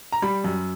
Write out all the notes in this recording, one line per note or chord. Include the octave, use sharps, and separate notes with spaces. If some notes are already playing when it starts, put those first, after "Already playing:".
A#5
G3 B5
F#2